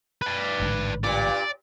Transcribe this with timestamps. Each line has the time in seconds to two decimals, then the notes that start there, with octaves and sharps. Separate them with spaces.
0.22 B4 D5
0.60 A1 G#2 D3
1.04 G2 A#2 D5